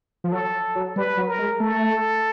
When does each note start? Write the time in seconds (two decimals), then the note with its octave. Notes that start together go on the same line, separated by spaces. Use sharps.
0.24 F3
0.32 F#3 A4
0.75 F#3
0.96 G3 B4
1.17 F#3
1.28 A#4
1.39 G#3
1.60 A3 A4